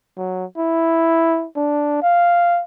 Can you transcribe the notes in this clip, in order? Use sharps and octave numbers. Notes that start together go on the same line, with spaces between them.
F#3
E4
D4
F5